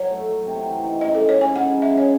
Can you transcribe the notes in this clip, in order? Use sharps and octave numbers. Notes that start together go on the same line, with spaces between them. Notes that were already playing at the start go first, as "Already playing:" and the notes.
Already playing: F#3 C#5
A3
F#3
C3
E3
D#4
C#3 D#5
A4
G#3
C#5
C#3 G#5
C#3 F#5
F#3
E5
G#4
C#5